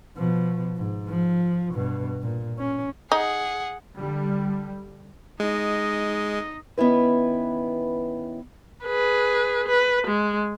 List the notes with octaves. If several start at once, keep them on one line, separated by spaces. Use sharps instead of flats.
B2 F3
G#2
F3
G2 B2
A#2
C#4
D#4 G#4 F#5
D3 G3
G#3 D#4 D#5
D#3 B3 C#4 E4 B4
G#4 B4
B4
G#3